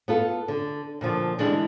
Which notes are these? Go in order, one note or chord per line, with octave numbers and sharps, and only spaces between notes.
B3 F4 A4
D3
A#2 D3 F3
D3 E3 G3 G#3 D4 E4